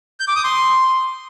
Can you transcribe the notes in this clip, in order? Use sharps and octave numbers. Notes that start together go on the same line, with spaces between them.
G6
D6
D#6
C6